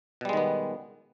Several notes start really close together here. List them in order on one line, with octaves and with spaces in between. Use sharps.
B2 G3 G#3 D#3 B3